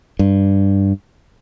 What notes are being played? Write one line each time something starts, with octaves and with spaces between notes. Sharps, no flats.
G2